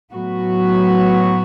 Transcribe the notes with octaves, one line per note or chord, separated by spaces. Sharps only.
A2 F#3 B3 F#4